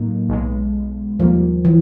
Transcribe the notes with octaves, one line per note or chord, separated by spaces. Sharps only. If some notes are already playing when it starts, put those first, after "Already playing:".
Already playing: A2 F#3 A#3 D#4
B1 B2 G#3
D#2 D#3 F3 G3 A#3
E3